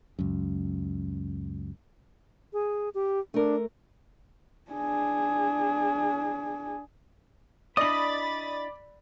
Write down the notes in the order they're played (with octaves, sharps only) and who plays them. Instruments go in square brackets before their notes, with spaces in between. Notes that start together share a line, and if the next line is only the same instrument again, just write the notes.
[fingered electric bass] C#2 F#2
[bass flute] G#4
G4
[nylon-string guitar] A3 A#4 [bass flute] D4
[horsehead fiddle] D4 G#4
[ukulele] D4 E4 D#5 [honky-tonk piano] D5 F#7 [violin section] B5 A6 [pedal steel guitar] D#6